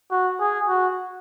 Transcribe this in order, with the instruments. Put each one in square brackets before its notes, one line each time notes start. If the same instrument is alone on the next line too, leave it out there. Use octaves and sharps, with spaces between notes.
[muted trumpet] F#4
G#4
F#4